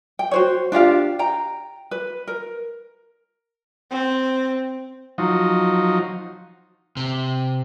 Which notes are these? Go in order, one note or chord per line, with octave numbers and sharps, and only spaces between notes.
G5
F#4 C5 C#5
D4 F4 G4 F5
G5 A#5
B4
A#4
C4
F3 F#3 D#4
C3